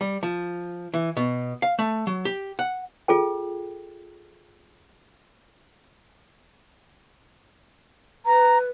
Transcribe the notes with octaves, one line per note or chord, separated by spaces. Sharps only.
G3
F3
E3
B2
F5
A3
F#3
G4
F#5
F4 G#4 A4 G5
B4 A#5